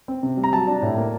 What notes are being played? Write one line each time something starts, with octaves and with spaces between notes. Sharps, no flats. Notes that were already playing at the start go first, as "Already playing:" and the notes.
C4
C3
G3
A#5
F#3 A5
D4
A2
A#3